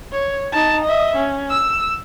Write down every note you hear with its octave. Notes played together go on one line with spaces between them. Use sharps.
C#5
D#4 A5
D#5 E5
C#4
E6